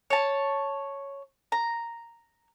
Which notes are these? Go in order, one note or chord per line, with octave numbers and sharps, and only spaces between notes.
C#5 A5
A#5